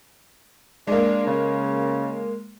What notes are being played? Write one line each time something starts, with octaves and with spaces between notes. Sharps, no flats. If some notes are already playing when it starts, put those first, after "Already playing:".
G#3 A#3 D4
C#3